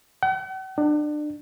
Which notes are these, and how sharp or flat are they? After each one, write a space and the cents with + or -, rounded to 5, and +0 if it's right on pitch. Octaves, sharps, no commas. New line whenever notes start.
F#5 +45
D4 +30